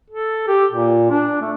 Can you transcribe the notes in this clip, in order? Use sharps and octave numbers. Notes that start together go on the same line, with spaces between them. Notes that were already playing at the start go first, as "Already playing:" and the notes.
A4
G4
A#2
D4
A3